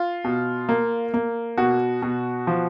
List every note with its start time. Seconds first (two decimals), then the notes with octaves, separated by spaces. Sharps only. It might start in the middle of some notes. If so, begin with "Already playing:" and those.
Already playing: F4
0.25 B2
0.69 A#3
1.14 A#3
1.57 B2 F#4
2.02 B2
2.47 F3